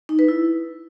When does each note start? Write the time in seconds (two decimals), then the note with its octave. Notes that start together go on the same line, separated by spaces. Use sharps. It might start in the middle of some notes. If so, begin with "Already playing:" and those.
0.09 D#4
0.19 B4
0.28 E4